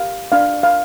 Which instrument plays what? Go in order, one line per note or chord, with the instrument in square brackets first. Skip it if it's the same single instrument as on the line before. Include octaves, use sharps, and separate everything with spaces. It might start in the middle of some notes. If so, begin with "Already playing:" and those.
Already playing: [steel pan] G4 F5
D4 F5
F5